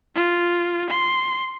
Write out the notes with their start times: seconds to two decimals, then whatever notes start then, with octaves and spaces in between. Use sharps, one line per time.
0.15 F4
0.90 C6